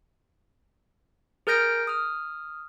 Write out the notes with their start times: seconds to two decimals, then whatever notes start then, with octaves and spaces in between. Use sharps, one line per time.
1.47 G#4 A#4 F6 G6 A#6 D7
1.87 D#6 F6